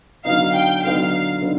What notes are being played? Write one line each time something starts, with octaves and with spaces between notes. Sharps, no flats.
D3 F#3 B3 D#4 F5
G5
D3 F#3 B3 D#4 F5
D3 F#3 B3 D#4